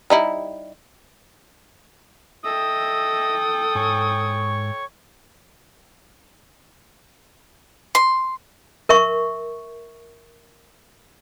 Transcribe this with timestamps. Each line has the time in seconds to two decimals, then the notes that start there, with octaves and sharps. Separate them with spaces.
0.10 G3 D#4 E4
2.44 A4 D#5 E5 G5 D#6 E6
3.75 G#2 C#5 G#5 C#6
7.95 C6
8.89 A#4 E5 C#6